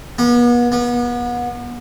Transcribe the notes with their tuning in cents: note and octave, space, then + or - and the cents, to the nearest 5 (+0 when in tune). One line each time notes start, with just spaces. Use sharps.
B3 -40
B3 -35